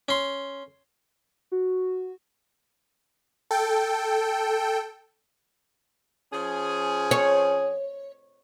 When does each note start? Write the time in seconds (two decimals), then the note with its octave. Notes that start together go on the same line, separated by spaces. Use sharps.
0.09 C#4 C6
1.52 F#4
3.51 A4 G5
6.32 F3 C#4 G#4
7.11 C#5